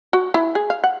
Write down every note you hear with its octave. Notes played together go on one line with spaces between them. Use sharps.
F#4
E4
G#4
F5
F#5